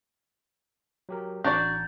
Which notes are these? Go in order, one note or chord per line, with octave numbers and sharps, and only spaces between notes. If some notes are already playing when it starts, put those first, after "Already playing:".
F#3 G4 A#4
A1 D4 F#4 D5 F#5 A#5 G6 A6